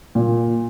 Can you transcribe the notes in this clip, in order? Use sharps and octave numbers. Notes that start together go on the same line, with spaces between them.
A#2